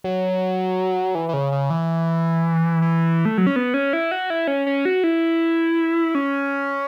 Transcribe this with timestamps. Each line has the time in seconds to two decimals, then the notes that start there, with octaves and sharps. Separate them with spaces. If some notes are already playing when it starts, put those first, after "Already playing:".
0.04 F#3
1.15 E3
1.29 E3
1.33 C#3
1.52 C#3
1.70 E3
2.82 E3
3.25 A3
3.38 F#3
3.47 C#4
3.56 B3
3.74 C#4
3.93 E4
4.11 F#4
4.30 E4
4.48 C#4
4.66 C#4
4.85 F#4
5.04 E4
6.15 C#4